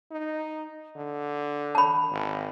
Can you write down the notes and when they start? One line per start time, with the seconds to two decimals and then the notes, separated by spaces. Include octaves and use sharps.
0.11 D#4
0.96 D3
1.75 A5 B5
2.12 G#1